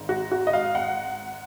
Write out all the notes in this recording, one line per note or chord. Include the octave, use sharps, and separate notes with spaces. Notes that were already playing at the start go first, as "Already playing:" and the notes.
Already playing: G#1 G#2
F#4
F#4
D#5
F5
F#5